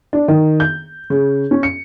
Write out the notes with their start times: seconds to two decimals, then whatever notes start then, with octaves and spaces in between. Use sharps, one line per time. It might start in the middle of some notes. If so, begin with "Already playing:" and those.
0.13 D4
0.28 D#3
0.60 G6
1.10 C#3
1.51 C#4
1.63 C#7